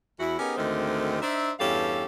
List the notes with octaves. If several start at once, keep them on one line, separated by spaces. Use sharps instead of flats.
E2 E4 F#4
B3 C#4 D#4 G4 G#4 A#4
D2 G#2 D3 D#3 A3 C4
D4 D#4 C5 E5
E2 G2 C#4 G4 A4 F5